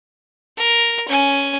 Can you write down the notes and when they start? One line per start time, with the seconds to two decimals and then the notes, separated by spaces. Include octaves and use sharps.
0.57 A#4
1.09 C#4 G#5